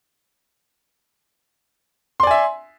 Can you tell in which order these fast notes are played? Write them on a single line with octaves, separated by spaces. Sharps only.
C6 D5 G#5 E5